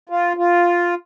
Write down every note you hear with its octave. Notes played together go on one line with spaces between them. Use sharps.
F4
F4